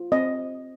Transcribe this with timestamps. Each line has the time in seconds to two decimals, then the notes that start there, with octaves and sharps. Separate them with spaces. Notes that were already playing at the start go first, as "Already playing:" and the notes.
Already playing: F4
0.12 C4 D#5